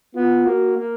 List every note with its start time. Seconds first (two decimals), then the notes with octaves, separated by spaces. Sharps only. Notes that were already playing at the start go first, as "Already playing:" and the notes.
0.15 B3 F4
0.46 A#3 F#4
0.77 A#3